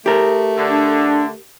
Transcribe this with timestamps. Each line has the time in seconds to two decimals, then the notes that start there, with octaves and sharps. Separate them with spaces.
0.06 A3 G4 A#4
0.56 D3
0.69 D4